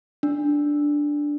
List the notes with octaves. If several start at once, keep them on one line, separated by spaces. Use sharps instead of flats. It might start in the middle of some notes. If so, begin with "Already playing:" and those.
D4